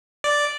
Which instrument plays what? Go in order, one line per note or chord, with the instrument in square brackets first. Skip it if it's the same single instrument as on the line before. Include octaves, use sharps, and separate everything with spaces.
[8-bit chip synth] D5